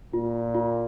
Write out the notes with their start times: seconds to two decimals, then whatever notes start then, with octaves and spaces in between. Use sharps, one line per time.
0.13 A#2 F4
0.55 F4